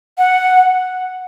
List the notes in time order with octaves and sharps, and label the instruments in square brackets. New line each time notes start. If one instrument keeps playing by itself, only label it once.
[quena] F#5